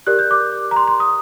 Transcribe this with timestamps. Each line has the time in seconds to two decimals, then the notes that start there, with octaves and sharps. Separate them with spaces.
0.07 G4 A#4 D5 F#6
0.19 G6
0.31 D6
0.71 A#5
0.76 C6
0.88 C6
1.00 D#6